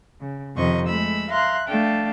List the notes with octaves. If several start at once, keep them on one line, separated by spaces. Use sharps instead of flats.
C#3
F2 C3 D#3 C5 D#5 C#6
G#3 A3 B5 E6
E5 F5 A#5 C6 F#6
A3 D4 F5 G5 A5